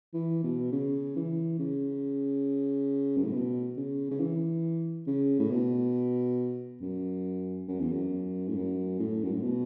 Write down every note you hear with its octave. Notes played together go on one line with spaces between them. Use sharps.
E3
B2
C#3
E3
C#3
F#2
A2
B2
C#3
C#3
E3
C#3
A2
B2
F#2
F#2
E2
F#2
A2
F#2
A2
F#2
A2
B2